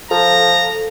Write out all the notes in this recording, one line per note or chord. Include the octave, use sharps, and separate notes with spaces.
F3 A4 A#5